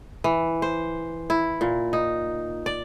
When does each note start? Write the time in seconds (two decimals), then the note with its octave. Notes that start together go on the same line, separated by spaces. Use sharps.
0.24 E3
0.62 C5
1.30 E4
1.61 A#2
1.93 D#4
2.66 D5